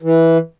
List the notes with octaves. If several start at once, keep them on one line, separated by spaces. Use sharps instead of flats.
E3